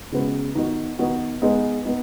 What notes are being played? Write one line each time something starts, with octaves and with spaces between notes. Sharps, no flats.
C#3 G#3 B3 F#4 B4
D#3 B3 D#4 F#4
D#3 B3 D#4 F#4
G#3 B3 D#4
B3 D#4